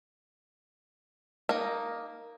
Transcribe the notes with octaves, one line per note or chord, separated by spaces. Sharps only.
A#3 D#4